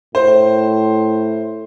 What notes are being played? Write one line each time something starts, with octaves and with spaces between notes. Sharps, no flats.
A2 C5